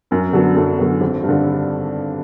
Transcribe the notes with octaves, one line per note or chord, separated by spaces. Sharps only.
F#2 A#4
D3 F#3 B3 A4
F#2 A4
D3 F#3 B3
G#1
G2
D3